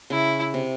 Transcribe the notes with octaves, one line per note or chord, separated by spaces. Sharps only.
C#3 E4
C3